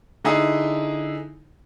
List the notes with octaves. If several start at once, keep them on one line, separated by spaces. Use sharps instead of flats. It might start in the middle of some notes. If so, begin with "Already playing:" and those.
D3 D#4 E4 G#4 D#6